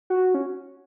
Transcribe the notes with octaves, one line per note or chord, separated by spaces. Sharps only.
F#4
C#4